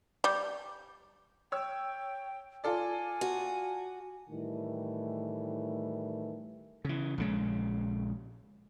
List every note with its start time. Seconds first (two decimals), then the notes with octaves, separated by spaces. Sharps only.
0.24 G3
1.52 C#5 G5 E6
2.64 F4 A4 D5 G#5
3.21 F#4
4.30 A2 D#3 E3 G3 A3
6.85 C#3 E3
7.18 A#1 C#3 G#3